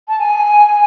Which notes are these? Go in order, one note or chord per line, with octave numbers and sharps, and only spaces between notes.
A5
G#5